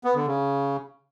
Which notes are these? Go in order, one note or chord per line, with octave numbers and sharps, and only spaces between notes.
B3
D3
C#3